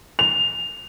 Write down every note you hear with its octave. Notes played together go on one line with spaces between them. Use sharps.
F7